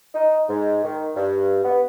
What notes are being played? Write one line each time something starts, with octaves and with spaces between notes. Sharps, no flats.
D#4
G#2
D#3
G2
B3